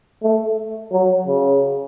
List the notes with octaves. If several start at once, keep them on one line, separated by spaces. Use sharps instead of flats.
A3
F#3
C#3